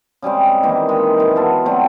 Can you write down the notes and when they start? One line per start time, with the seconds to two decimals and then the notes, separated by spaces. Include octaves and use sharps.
0.22 C#3 G3 G#3 C4
0.63 D#3 E3 A#3 D#4
0.89 G#3
1.18 F#2 E3
1.36 B3 F4 A4
1.66 F#3 G3 A3 C4